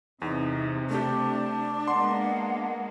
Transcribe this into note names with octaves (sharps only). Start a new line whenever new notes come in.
E2 C3 D#4
A3 D4 G4
G#3 A#3 B3 F#5 C6